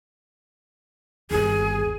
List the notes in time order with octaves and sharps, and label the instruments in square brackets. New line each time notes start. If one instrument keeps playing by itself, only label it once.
[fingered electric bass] G1 D#2 [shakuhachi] G#4